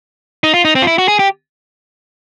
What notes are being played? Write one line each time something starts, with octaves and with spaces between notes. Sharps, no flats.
D#4
F4
D#4
C4
F4
E4
F#4
G#4
G4